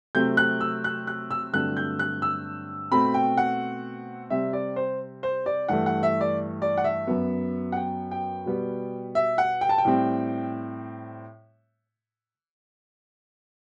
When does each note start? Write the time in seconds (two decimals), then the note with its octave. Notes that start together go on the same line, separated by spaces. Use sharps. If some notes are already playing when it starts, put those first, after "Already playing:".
0.15 C3 F#3 A3 C4 G6
0.37 F#6
0.61 E6
0.84 F#6
1.07 F#6
1.31 E6
1.53 G2 D3 F#3 A3 C4 F#6
1.77 G6
1.99 F#6
2.22 E6
2.91 B2 A3 C4 B5
3.14 G5
3.37 F#5
4.30 C3 G3 C4 E5
4.53 D5
4.76 C5
5.23 C5
5.46 D5
5.68 G2 E3 A3 F#5
5.86 F#5
6.03 E5
6.21 D5
6.62 D5
6.77 F#5
6.84 E5
7.07 F#2 F#3 B3
7.72 F#5
7.77 G5
8.11 G5
8.46 B2 G3 B3
9.15 E5
9.38 F#5
9.61 G5
9.69 A5
9.78 G5
9.85 A2 G3 C4